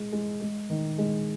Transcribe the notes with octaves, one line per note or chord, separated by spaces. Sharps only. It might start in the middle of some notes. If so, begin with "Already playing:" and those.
Already playing: G#3
G#3
G#3
D#3
G#3